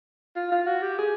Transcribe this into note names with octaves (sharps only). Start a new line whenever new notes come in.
F4
F4
F#4
G4
G#4